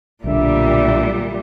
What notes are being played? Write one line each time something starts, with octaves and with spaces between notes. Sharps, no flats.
B1 A#2 D3 G3 E5